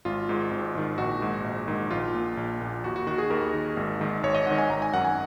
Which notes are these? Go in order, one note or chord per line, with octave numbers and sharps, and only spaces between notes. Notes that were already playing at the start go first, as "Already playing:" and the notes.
G#1 F4
G#2 D#3
G#1
G#2 D#3
A#1 F#4
G#2 D#3
A#1
G#2 D#3
A#1 F4
A#2
A#1
A#2
D#2 F#4
F#4
D#3 F#4
G#4
D#2 A#4
D#3
G#1
G#2 D#3
G#1 C#5
D#5
G#2 D#3 F#5
G#5
G#1 A#5
G#5
F#2 D#3 F#5
G#5